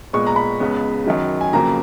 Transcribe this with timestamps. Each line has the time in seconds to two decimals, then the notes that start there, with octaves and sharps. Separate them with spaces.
0.13 A#2 G#3 B3 C#6
0.27 A#5
0.36 B5
0.60 C#2 C#3 G#3 B3
1.06 F#2 D#3 F#3
1.41 G#5
1.53 F2 C#3 F#3 A#3 A#5